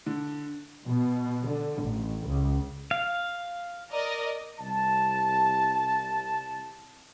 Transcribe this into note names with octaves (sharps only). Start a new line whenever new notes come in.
D3
B2
D3
A1
C#2
F5
A#4 D5 D#5
C2 A5